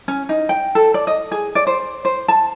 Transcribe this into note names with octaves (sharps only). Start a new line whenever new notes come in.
C#4
D#4
G5
A4
D5
D#5
G#4
D5
C5
C5
A5